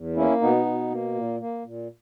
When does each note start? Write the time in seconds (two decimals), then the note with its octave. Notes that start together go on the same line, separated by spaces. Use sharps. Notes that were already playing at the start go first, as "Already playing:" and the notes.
Already playing: E2
0.16 A#3 C#4 E4
0.41 B2 B3 D#4
0.66 B2
0.90 A#3
1.14 A#2
1.40 A#3
1.64 A#2